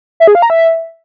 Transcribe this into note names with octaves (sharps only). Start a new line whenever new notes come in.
E5
G#4
F5
A#5
E5